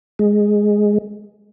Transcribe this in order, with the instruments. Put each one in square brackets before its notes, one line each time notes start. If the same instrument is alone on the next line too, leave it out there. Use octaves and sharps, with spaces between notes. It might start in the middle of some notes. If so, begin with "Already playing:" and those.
[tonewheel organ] G#3